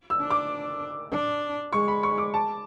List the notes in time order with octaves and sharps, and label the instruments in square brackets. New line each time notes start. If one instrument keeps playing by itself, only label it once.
[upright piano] E6
[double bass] D4
[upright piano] D6
[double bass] D4
[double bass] G#3 [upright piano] C#6
[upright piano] B5
C#6
D6
A5